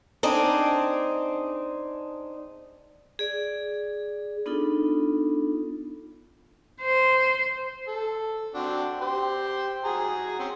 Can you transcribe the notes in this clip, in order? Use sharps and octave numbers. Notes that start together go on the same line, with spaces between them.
C4 D4 D#4 G#4
G#4 D5
B3 D4 D#4 F4 A4
C5
A4
C4 D4 F#4
G4 C5
F#4 G#4 A#5
C4 C#4